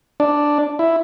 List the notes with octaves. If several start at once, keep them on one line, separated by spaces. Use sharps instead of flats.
D4
E4